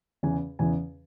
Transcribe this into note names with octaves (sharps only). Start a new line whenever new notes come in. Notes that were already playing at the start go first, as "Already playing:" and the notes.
E2 C#3 E3 G#5
E2 C#3 E3 G#5